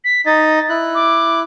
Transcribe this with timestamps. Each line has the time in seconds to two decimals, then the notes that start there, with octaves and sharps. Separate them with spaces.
0.05 B6
0.26 D#4 D#5 A6
0.69 E4 F#6
0.95 D6